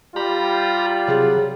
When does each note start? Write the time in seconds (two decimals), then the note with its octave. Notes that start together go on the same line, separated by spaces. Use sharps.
0.16 G3 F4 G4 A#5 B5
1.08 C3 F#3 G#4